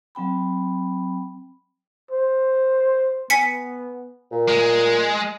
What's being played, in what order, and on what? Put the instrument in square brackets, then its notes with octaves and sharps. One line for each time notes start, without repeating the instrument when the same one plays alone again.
[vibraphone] F#3 C4 G5 B5
[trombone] C5
[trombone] B3 [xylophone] G#5 B6 C#7
[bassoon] A#2
[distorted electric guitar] G#3